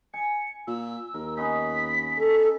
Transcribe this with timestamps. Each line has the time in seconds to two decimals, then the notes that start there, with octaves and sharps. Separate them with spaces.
0.14 G#5 C#7
0.67 A#2 E6
1.14 D#2 A#4
1.37 B3 C#4 D#4 B6
2.17 A4